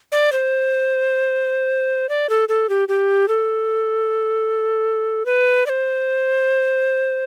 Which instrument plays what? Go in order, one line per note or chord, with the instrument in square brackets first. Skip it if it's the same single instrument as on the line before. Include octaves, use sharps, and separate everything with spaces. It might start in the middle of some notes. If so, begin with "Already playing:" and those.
[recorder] D5
C5
D5
A4
A4
G4
G4
A4
B4
D5
C5